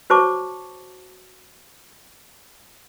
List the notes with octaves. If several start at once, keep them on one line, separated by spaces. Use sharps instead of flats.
F#4 C5 C#5 A5 C#6 D6